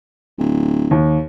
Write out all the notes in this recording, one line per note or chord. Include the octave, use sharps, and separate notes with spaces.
D1
D#2